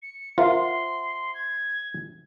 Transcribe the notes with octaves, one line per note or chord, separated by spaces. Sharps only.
C#7
F4 A#4 C5 E5 F#5 C6
G#6